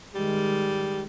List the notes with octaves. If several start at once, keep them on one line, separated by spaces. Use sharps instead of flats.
D#3 G3 G#3